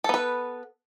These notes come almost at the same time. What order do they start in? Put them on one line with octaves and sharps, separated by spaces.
A4 B3 B4